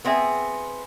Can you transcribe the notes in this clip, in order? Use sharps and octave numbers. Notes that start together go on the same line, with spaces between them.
B3 C4 G#4 E5